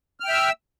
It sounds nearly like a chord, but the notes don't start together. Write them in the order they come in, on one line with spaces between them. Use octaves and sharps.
F6 G5 E5 E6